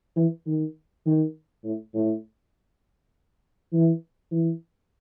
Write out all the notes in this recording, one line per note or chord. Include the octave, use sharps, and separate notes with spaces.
E3
D#3
D#3
A2
A2
E3
E3